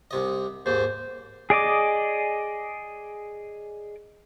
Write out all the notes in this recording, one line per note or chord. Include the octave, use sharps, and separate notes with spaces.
C2 C3 D#5
D#2 G#2 C5
G#4 D5 D#5 D6